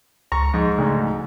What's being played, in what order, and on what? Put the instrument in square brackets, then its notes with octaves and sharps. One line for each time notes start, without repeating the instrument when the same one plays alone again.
[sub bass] C#2 [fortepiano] A#5 C#6
[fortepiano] G#2 [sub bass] F3
[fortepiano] D2 G#2 [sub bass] C#3